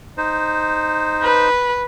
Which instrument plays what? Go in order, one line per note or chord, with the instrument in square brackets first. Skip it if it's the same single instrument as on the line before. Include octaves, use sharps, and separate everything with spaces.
[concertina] D#4 C5
[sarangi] B4